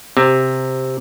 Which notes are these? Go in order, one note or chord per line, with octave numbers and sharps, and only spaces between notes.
C3